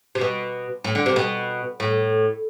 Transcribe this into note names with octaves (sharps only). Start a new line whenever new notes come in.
C3
B2
A2
D3
C3
B2
A2